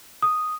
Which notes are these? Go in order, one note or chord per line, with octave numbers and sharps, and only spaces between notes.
D#6